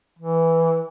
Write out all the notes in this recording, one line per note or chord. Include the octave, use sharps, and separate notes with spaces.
E3